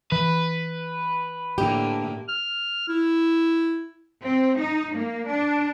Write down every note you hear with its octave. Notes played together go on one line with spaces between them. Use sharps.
E3 B4
A2 D3 A#3 G4
F6
E4
C4
D#4
A#3
D4